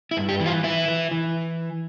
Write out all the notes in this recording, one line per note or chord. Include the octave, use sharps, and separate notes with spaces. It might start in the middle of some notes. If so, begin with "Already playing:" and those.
E4
G2
G4
E3
F4
E3 E4
E3
E3